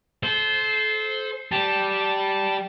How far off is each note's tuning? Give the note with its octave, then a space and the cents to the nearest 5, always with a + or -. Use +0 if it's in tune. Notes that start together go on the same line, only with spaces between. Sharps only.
A4 -30 C5 +0
G3 -10 A5 +0